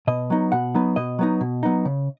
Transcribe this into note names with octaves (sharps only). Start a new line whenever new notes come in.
B2 D#5
F#3 B3 D#4
B2 F#5
F#3 B3 D#4
B2 D#5
F#3 B3 D#4
B2
F#3 B3 D#4
C#3